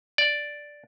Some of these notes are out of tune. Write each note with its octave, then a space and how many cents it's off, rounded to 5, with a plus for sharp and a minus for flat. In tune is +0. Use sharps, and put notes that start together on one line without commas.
D5 +0